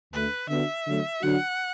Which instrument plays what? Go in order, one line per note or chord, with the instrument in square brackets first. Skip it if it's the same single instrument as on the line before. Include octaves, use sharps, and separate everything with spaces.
[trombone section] D2 D3 A3 [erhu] B4
[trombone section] D3 B3 D4 F#4 [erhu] E5
[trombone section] D3 F#3 A3
[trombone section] D3 F#3 D4 F#4 [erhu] F#5